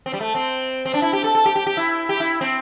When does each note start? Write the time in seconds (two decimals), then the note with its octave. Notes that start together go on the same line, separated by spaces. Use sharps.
0.06 C4
0.13 G3
0.20 A3
0.35 C4
0.85 C4
0.94 D4
1.02 E4
1.13 G4
1.24 A4
1.35 A4
1.45 G4
1.55 G4
1.67 G4
1.77 E4
2.09 G4
2.20 E4
2.41 C4